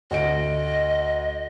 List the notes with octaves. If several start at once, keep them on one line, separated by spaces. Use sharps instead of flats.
D2 D#5 D7